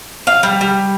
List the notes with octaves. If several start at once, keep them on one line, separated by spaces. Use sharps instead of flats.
F5
G3
G3